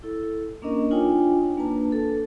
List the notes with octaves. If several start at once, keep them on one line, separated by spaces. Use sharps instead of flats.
E4 A4
A#3 C#4 D4 A#4 D#5
D4 D#4 F4 C#5 G5 G#5
A#3 D4 B4 A5
A4